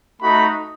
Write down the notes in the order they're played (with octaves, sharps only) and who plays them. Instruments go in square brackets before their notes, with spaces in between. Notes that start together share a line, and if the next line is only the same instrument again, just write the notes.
[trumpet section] A3 D#4 F#4 B5